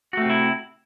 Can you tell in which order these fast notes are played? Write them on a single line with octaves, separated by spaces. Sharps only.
F#4 A3 C4 C3 E4